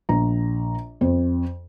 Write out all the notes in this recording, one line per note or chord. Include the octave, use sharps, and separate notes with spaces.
A#1 A#5
F2 C5